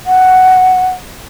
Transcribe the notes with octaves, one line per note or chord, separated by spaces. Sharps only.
F#5